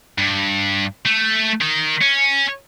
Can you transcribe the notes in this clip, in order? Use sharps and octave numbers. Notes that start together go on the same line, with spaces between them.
G2
A3
D#3
C#4